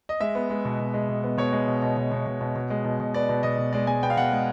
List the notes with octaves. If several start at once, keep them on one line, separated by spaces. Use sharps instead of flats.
D#5
G#3 E5
B3
G#3
B2
B2
G#3
B2
B3
B2 C#5
G#3
B2
B2
B2
B2
B2
B2
B2
G#3
B2
B2
B3 D5
B2
B2 D#5
B2
G#3 D5
G#3 G#5
B3 G5
F5
B2 F#5
G#3